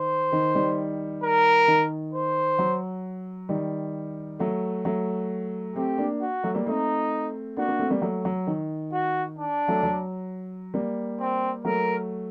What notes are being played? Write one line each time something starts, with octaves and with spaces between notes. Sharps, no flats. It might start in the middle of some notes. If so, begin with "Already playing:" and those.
Already playing: D#3 C5
D#3
D#3 G3
A#4
D#3
C5
F#3
D#3 G3
F#3 A3
F#3 A3
A3 C4 G4
A#3 D4
F#4
F#3 A3
G3 A#3
A3 C4 D#4
A#3 D4 F#4
A#3 D4
A3 C4
G3 A#3
F#3 A3
F#3
D#3
F#4
D4
F#3 A3
F#3
G3 A#3
C4
F#3 A3 A#4